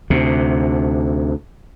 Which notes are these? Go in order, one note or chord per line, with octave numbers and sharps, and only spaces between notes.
D2 C3